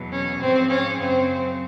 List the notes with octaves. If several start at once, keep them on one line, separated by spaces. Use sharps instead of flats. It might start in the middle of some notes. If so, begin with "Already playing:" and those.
Already playing: E2 B2 F#3
C#4
G#2 F3 G#3 C4
C#4
F#2 C#3 F#3 C4